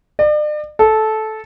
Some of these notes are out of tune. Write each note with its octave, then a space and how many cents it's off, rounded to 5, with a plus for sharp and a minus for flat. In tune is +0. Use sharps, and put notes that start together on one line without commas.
D5 +40
A4 -15